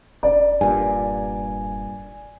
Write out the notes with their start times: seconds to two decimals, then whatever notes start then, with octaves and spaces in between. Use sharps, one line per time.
0.23 F1 D5
0.61 G2 A#2 G#5